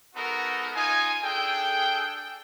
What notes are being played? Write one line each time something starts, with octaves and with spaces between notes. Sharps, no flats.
G#3 B3 D#4 F#4 A4 A#4
D#4 F4 G#5
D4 G#4 A4 G5